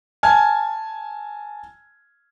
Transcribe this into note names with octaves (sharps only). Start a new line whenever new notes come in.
G#5 A5 F6 G#6